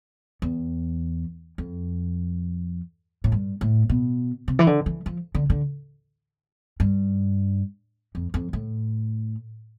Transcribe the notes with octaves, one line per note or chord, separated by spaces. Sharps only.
E2
F2
A2
G2
A2
B2
C3
E3
D3
E3
F3
D3
D3
G2
F2
F2
A2